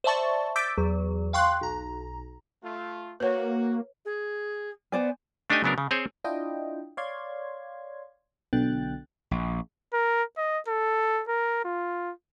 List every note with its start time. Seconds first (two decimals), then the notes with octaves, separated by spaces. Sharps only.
0.04 C5 D5 E5 A5 C#6 A6
0.56 D6 E6 G6 A6 B6 D7
0.78 E2 F#3
1.33 F5 G5 C6 C#6 F#6
1.61 B1 A#5
2.62 A3 F4
3.20 A#3 F#4 B4 C#5
4.05 G#4
4.92 B3 C5 D5 G#5
5.50 A3 D4 D#4 G4 D#5 G#5
5.64 C#3 F#3 B3 D4 A#4
5.78 C#3
5.91 C4 G#4 C5 C#5
6.24 D4 E4 F4 D#5 G5
6.97 C#5 D5 F5 C6 G#6
8.53 B1 B2 D3 G5 F#6 A6
9.31 A#1
9.93 A#4
10.37 D#5
10.68 A4
11.28 A#4
11.65 F4